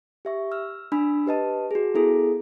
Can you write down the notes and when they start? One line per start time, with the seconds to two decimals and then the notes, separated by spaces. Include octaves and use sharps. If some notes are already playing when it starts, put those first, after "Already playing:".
0.25 G4 E5 C#6
0.52 E6 F6
0.92 D4 G#5 B5 E6
1.26 G4 B4 D#5 A5
1.71 F#4 G#4
1.94 B3 E4 G#4 A4